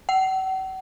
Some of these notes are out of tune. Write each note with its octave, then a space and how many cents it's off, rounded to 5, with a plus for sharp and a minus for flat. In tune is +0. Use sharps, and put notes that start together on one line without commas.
F#5 +45